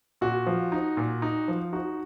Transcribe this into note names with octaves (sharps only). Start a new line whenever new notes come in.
A#2 F#4
F3
D#4
A#2
D#4
F3
D#4 F#4